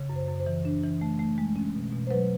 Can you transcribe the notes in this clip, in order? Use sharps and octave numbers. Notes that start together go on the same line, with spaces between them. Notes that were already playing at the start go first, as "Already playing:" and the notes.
Already playing: C#3
F#2
C5
F#2
C5
E3
D4
E3
A3
A3
G#3
C#4
B2
B2
C5
F#3 B4